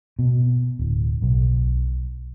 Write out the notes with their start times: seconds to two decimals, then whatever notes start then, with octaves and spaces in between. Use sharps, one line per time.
0.19 B2
0.79 D1
1.22 B1